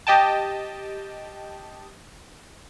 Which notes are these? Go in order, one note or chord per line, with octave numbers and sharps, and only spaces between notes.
G4 D#5 G5 A5